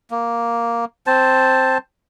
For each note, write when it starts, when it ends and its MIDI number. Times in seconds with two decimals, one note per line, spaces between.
0.11 0.85 58
1.07 1.78 60
1.07 1.78 72
1.07 1.78 81